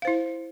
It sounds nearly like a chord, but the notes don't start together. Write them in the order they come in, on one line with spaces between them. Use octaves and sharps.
F5 C5 E4